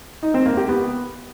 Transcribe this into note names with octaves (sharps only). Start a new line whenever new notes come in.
D#4
C4
A#3
G4
B3